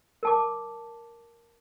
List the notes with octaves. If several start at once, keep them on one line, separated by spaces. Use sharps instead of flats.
A#4 A5 D6